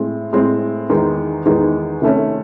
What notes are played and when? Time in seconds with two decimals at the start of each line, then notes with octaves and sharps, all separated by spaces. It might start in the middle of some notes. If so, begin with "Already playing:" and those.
Already playing: A2 G#3 C4
0.33 A2 G#3 C4
0.89 E2 D#3 G#3 D#4
1.46 E2 D#3 G#3 D#4
2.02 C3 D#3 A3 C#4